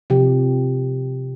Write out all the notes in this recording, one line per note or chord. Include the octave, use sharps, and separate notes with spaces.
C3 F3 G4